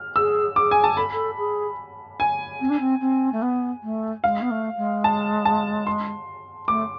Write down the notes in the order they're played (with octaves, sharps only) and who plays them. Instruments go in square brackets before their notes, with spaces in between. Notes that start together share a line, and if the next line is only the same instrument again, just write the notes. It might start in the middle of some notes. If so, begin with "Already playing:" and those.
Already playing: [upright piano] F6
[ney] G#4 [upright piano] E6
[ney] G#4 [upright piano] D6
[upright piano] G#5
A5
[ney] A4 [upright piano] B5
[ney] A4
G#4
[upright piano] G#5
[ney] C4
D4
C4
C4
A3
B3
A3
[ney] G#3 [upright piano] F5
[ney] B3
A3
G#3
[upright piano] A5
A5
C6
[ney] A3 [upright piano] D6